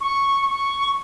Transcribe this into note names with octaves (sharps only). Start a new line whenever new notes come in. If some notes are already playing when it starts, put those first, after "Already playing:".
C#6
C#6